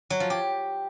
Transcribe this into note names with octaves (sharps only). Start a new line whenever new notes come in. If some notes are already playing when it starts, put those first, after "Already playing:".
F#3
F3
G4